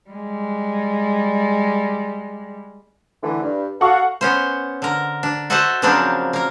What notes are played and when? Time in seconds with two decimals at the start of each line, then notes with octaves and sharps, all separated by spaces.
0.11 G3 G#3
3.23 D3 E3 A3
3.43 G2
3.81 F#4 A4 F5 F#5 C#6
4.21 B3 C#4 C5
4.82 D3 A#4
5.23 D4
5.50 F#4 A4 C5 D#5 E5 F#5
5.82 C#3 F3 F#3 A#3 C4 D4
6.33 A#3 A#4